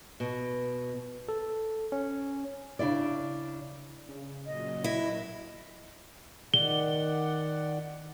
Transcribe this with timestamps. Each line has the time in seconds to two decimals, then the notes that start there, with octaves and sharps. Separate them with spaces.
0.20 B2
1.28 A4
1.92 C#4
2.79 C#3 D4 E4 D5
4.09 C#3
4.46 A#2 F#3 D#5
4.84 E4
6.54 D#3 D5 F#5 G7